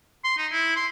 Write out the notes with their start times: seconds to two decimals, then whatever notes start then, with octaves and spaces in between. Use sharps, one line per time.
0.24 C6
0.38 D#4
0.52 E4
0.76 C6